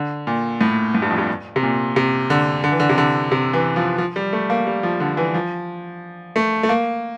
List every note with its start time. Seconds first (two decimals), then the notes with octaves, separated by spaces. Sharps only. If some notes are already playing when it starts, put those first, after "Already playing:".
Already playing: D3
0.27 A#2
0.61 A2
0.95 A2
1.02 G2
1.10 F2
1.18 G2
1.56 C3
1.63 A#2
1.96 C3
2.30 D3
2.64 D3
2.72 E3
2.80 D3
2.89 C3
2.98 D3
3.32 C3
3.53 E3
3.76 F3
3.98 F3
4.16 G3
4.33 A3
4.50 A#3
4.67 G3
4.83 F3
5.00 D3
5.17 E3
5.34 F3
6.36 A3
6.63 A3
6.69 A#3